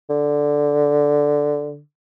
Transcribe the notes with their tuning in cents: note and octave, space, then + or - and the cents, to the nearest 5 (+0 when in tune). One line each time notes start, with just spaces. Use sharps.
D3 -5